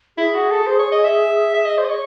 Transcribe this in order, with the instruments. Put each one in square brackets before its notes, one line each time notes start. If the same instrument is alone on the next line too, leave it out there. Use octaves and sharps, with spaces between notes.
[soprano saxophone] E4 [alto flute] G#4
[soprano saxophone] F#4
A4
C5
C#5
D#5
E5
E5
D#5
C5
D#5
C#5